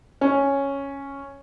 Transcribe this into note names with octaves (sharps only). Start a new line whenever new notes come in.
C#4